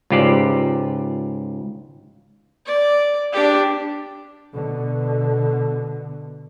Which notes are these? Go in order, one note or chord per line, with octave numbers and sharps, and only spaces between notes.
C#2 G#2 F4 G4 C5 D5
D5
D4 G4
B2 D3